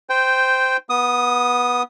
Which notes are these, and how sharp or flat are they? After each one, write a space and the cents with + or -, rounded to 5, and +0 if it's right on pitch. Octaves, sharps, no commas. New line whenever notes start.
C5 -10 G5 +0
B3 -15 D#6 +0